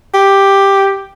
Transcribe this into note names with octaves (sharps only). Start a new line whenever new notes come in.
G4